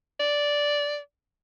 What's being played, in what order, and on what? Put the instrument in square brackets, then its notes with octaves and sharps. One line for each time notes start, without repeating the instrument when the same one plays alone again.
[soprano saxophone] D5